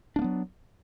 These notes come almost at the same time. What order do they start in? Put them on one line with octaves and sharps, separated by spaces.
D4 A#3 B3 F#3